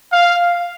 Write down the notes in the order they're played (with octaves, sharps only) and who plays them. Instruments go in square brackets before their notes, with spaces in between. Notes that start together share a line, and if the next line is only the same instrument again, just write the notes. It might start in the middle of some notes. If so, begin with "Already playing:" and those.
[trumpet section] F5